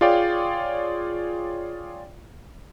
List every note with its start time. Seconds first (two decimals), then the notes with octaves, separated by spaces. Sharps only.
0.01 F4 G#4 C#5 D5 F5 G5